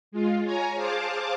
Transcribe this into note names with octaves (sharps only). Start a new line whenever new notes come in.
G#3 F4
C#5 G#5 A#5
G#4 C5 F5 A5 D6